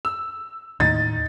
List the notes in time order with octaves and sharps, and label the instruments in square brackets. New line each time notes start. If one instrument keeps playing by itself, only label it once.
[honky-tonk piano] E6
[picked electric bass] D#2 A2 [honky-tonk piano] D#4 [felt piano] A6